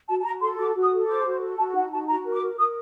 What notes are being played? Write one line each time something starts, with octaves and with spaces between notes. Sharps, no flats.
F#4 A5
A5
F#4 A#5
A4 C6
F#4 D6
F#4
D#6
A4
C5 D6
F#4
A4
F#4 A5
D#4 F#5
F#4 A5
F#4 A#5
A#4
D6
A#4
A#4 D#6